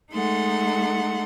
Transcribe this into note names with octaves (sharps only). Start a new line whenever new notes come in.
G#3 A3 D#4 A4 F#5 C6